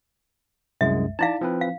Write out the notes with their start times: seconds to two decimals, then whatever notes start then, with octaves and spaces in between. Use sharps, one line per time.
0.81 C2 F#2 G#3 E5
1.19 D#4 E4 D5 F5 A5
1.41 F3 C4 B4
1.61 F5